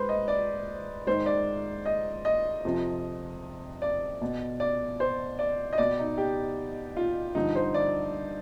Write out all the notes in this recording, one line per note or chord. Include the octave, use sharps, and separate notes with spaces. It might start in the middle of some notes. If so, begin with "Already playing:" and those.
Already playing: G#2 B4 C5
D#5
D5
G#2 D#3 C5
D5
D#5
D#5
F2 C3 F3
D5
B2
D5
C5
D5
D#5
B2 D5
D#4
G4
F4
G2 D3 F3 D#4
C5
D5